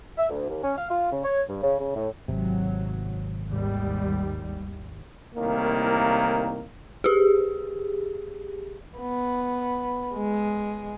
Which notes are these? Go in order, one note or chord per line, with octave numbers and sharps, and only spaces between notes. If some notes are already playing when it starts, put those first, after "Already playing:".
E5
D2
D#2
C#4
F5
F4
C#3
C#5
G2
C#3
C#3
A2
G#1 C3 F#3
D#2 G#2 G3
C2 A2 D#3 A#3
G4 G#4
B3
G#3